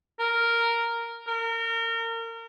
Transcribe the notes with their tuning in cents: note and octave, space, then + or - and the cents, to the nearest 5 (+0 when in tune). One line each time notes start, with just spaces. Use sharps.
A#4 -5
A#4 -30